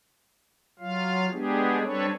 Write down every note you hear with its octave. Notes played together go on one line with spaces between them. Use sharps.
F#3 F4 F5
G#3 B3 D4 G4 G#4
G3 C4 D4 A4 B4 C#5